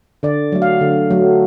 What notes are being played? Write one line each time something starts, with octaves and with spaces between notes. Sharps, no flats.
D3 D5
F#3 A3
F5
D3
F#3 A3